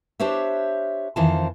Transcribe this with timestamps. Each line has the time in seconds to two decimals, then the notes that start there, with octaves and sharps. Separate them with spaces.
0.20 D4 G4 C5 C#5 E5
1.16 F2 D#3 E3 F4 C5 A5